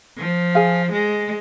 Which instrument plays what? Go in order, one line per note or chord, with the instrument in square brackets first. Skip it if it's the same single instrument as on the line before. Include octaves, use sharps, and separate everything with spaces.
[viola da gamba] F3
[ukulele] G#4 F5 G#5
[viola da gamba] G#3